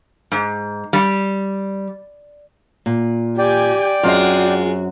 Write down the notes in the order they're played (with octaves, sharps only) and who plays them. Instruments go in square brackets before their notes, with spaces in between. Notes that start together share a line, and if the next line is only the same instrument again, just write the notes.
[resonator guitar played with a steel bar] G#2
G3
[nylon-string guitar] A#2
[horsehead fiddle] G4 G#5 [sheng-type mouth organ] D5 G5
[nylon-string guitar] F#2 C4 [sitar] G#3 F4 [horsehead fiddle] F#4